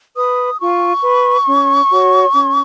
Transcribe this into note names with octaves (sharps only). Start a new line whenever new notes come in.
B4 D#6
F4 C#6
B4
C#4
F#4 C#5
C#4